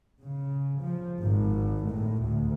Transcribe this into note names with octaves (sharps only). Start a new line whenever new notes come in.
C#3
F3
G#1
A2
D2